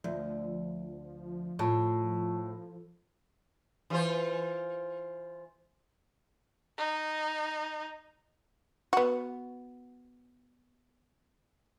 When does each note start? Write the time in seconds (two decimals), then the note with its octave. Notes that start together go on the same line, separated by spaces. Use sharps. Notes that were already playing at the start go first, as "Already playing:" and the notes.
0.04 D2 F3
1.59 A2 F4 A5 C#6
3.90 E3 F4 C5
6.78 D#4
8.93 B3 F#4